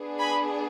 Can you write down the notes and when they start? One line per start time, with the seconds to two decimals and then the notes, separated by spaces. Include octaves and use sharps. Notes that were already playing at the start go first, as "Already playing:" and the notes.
Already playing: B3 D4 G#4
0.19 G#5 B5